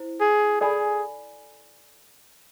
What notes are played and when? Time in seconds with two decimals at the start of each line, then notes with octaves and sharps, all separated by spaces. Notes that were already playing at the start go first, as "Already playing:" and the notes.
Already playing: E4 C5
0.21 G#4
0.61 G#4 A4 D5 G#5 B5